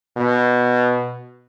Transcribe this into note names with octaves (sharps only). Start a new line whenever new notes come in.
B2